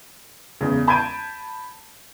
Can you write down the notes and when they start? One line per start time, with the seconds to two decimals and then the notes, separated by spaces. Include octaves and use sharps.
0.61 E2 C#3
0.87 A5 B5 G6 G#6 D7 D#7